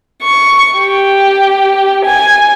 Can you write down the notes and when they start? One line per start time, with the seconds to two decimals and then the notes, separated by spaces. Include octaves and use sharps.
0.22 C#6
0.77 G4
2.05 G#5